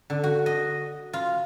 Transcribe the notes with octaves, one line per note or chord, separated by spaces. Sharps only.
D3
F#4
D#5
F4